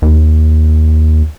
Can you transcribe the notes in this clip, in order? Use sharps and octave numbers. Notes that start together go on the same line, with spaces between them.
D#2